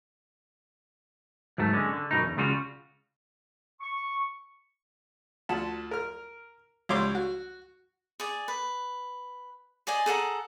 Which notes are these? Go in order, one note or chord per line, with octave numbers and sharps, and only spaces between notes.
D#2 G#2 F#3 A3
D3 G#3 C#4
D3
F#2 B2 D#4
E2
C#2 C#3 G3 F4 F#4
C#6
D2 F4 F#5 A5
A#4 F6
C#2 G3 C#5 F5 C6 D6
F#4
G#4 D5
B4
G#4 D5 D#5 G#5
G#4 A4 F#5 A#5